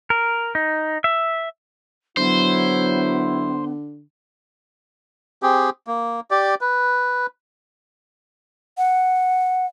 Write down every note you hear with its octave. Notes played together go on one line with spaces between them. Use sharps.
A#4
D#4
E5
D3 F#3 B3 E4 C5
C4 G4 G#4
A#3
G4 D5
B4
F#5